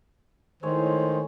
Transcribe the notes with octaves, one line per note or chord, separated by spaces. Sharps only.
A2 D#3 G#3 C5 C#5